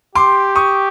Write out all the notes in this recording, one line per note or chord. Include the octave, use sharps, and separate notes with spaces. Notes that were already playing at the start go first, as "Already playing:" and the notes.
G4 C6 D6
C#6 D#6